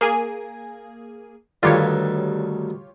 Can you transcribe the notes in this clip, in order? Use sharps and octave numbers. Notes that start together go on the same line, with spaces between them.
A#3 G#4 G#5
D2 G2 D#3 F4 G4 C#5